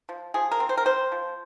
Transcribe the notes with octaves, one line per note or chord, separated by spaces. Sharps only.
F3
F3 G#4
A#4
C4
C5
A#4
C4 C5
F3